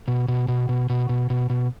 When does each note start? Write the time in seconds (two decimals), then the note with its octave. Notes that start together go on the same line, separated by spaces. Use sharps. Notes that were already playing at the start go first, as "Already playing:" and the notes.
0.08 B2
0.28 B2
0.48 B2
0.69 B2
0.90 B2
1.09 B2
1.30 B2
1.50 B2